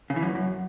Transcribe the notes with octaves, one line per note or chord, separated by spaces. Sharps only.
C#3
E3
F#2
E2
F#2